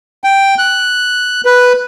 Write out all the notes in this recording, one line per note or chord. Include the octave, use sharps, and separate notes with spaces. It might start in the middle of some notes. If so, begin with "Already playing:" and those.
G5
F#6
B4